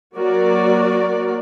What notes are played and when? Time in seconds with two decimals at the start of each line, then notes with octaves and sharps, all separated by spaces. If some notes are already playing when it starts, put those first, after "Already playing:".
0.15 F#3 A#3 F#4 A#4 D5